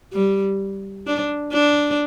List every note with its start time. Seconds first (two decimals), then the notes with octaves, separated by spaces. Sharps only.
0.13 G3
1.07 D4
1.53 D4